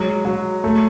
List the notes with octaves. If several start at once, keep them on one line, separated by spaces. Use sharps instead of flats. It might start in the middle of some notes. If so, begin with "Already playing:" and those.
Already playing: F#3 G#3
F#3
A3